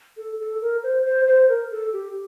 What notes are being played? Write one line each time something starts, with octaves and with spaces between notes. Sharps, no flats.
A4
A4
A#4
C5
C5
C5
A#4
A4
G4